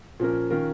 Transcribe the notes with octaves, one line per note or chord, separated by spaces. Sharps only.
A#2 F3 C#4 A#4
D#3 C#4 F4 A#4